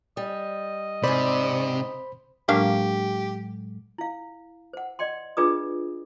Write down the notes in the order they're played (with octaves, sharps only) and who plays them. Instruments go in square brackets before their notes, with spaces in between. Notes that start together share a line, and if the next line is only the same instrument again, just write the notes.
[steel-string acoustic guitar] G3 [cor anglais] D#5
[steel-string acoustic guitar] G#2 D5 [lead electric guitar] C3 [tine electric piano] C5 B5
[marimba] A2 F#3 G#3 [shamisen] A#3 D4 F5 [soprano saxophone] G4
[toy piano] E4 F5
C5 F#5
D5 D#5 G5 C6
D4 F4 G#4 B4 D5 D#6